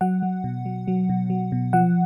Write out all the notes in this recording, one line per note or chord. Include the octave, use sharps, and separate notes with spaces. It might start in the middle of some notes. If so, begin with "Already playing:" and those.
F#3 F#5
F#3
B2
F#3
F#3
B2
F#3
B2
F3 F#5